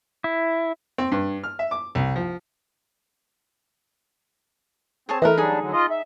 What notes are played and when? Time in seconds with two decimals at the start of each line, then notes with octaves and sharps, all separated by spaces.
0.24 E4
0.98 C4
1.12 G2
1.44 F6
1.59 E5
1.71 D6
1.95 C2
2.16 F3
5.09 C4 G#4 C#5 A5
5.22 E3 A3 A#4 B4 D#5
5.38 F#3 G3 D4 D#4 G#4
5.60 D3 F#3
5.73 F4 D#5
5.90 E5